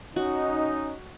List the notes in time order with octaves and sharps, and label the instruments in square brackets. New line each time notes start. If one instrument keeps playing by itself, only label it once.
[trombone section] C#4 D#4 [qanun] F#4